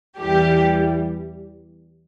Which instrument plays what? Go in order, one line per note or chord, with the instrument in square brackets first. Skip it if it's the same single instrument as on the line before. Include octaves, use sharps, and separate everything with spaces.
[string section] E2 E3 G3 G4